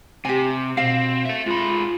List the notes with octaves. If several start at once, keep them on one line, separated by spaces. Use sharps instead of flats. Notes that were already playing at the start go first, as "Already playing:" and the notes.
C3 G4 G#5
B2 C4 F5
A4 E5
G#2 F4 B5